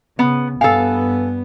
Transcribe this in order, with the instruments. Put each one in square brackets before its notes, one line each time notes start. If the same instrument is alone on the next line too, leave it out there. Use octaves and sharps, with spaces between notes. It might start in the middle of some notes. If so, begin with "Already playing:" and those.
[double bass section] C#3 [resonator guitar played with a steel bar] B3
[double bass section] G2 B3 [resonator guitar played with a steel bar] A4 F5 [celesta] G#5